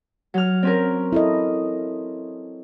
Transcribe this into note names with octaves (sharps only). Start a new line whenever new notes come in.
F#3 F6
C4 C#4 A#4
E4 A4 D#5